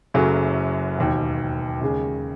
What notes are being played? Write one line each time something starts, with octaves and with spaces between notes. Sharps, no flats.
F#1 F#2 C#3 F#3 A3
E1 D#2 D#3
D#2 C#3 G#3